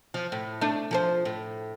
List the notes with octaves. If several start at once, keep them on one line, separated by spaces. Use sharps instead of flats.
F3
A2
A3 D4
F3 A4 C5
A2